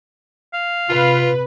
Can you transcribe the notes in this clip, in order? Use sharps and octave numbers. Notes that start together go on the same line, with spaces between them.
F5
C3 F4 B4